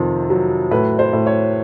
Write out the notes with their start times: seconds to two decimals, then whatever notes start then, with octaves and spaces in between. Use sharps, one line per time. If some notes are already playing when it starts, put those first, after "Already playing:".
Already playing: F2 C3 D#3
0.30 F#3
0.71 A2 B4
0.99 C5
1.13 A2
1.27 C#5